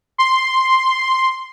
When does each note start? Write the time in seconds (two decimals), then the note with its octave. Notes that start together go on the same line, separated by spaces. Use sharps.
0.18 C6